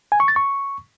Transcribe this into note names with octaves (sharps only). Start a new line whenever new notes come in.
G#5
C#6
A6
C#6